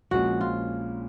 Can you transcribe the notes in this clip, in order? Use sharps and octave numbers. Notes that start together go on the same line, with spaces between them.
A#1 A#2 F3 G#3 C#4 F#4
F4